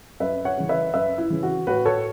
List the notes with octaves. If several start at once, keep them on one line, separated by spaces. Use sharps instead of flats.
F#2 B4 E5
C#5 F#5
C#3 E3
B4 E5
F#2 B4 E5
E4
C#3 E3
F#4
A2 F#4 B4
A4 C#5